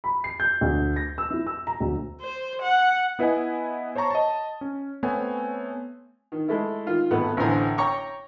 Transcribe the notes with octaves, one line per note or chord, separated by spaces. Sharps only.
B5
C7
G6
D2
A#6
E6
E4
E6
A#5
D2
C5
F#5
B3 E4 B4 D#5 F#5 G#5
C5 C#5 A5 A#5 C#6
D#5 A5
C#4
A3 B3 C4 C#5 G#5
D#3
G#3 A3 E4
D#3 F4
G#1 A3 B3 F#5
A1 D3 E3 C5 G#5 A#5
C#5 G5 A#5 C#6 D6